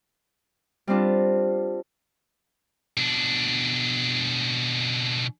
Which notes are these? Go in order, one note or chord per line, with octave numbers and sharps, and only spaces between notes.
G3 C4 D4 F4
B2 D4